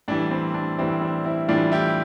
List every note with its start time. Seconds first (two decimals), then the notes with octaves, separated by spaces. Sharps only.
0.08 A2 E3 G3 D4
0.31 C4
0.54 D4
0.78 A2 E3 G3 C4 E4
1.02 D4
1.25 C4 E4
1.48 A2 E3 G3 D4 F4
1.72 E4 G4